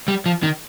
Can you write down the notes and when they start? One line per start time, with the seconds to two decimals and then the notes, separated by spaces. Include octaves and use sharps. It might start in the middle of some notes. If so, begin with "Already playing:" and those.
0.08 G3
0.26 F3
0.43 D#3